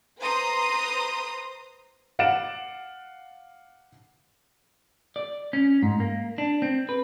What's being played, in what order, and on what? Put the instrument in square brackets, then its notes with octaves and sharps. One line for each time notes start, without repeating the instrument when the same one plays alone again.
[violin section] B4 C5 A#5 C6 D#6
[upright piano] F5 F#5 D6 A6 D7 E7
[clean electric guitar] D5
C#4
G#2
A#3
D4
C4
B4